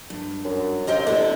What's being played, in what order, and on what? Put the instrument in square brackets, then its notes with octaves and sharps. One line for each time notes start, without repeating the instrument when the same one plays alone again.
[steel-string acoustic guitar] G2
[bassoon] F#2
[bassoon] C3 [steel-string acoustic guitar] G4 D#5 F5
[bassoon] D3 [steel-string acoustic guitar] B3 E4 A4